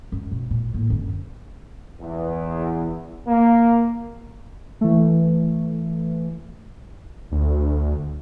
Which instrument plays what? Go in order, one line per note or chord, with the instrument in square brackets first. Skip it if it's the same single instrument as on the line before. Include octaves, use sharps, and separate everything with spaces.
[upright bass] F#2
B2
A#2
A2 A#3
F#2 D3
[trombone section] E2
A#3
[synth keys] E3 A3
[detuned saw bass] D2